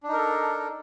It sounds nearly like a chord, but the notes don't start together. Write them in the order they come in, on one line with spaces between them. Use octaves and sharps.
D4 D#4 A#4 A4